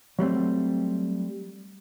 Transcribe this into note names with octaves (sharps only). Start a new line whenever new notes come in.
F#3 G3 A3 C4